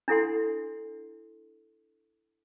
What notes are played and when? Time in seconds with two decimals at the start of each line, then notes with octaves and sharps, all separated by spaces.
0.08 D4 E4 A4 F#5 C6